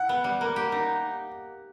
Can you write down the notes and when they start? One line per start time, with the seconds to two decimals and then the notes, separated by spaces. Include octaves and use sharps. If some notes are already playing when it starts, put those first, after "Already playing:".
Already playing: E4 F#5
0.09 B3
0.24 G3
0.41 A#3
0.56 G4
0.72 D#4